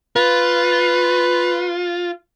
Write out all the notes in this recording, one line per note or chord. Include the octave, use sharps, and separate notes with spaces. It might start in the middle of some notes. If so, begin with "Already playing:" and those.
F4 B4